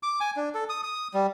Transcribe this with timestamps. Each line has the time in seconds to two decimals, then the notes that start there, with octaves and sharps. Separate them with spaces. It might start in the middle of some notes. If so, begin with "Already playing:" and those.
0.03 D6
0.21 G#5
0.36 D4
0.54 A4
0.69 D#6
0.84 D#6
1.14 G3